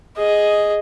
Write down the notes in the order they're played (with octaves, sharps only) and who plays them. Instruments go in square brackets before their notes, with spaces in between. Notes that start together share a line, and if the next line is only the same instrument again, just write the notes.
[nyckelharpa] G#4 D#5